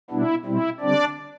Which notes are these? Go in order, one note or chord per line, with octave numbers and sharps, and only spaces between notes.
B2 G3 B3 D4 E4
B2 G3 C4 E4
D3 G3 C4 D4 D5